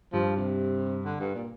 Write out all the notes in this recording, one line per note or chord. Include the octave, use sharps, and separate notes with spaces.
G2 F3
C3
D3
G2
A#2